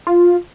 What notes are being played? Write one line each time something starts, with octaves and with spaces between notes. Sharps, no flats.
F4